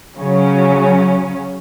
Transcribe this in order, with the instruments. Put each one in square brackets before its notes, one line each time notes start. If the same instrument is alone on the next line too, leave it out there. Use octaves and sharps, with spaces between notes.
[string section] C#3 F#3 C#4